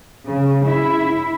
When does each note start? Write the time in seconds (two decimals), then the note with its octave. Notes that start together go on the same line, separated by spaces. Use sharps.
0.24 C#3
0.64 E4